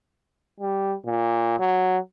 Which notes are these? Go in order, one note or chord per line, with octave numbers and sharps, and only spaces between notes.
G3
A#2
F#3